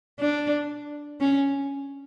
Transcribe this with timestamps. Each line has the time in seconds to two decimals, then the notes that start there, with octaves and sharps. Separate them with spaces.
0.20 D4
1.21 C#4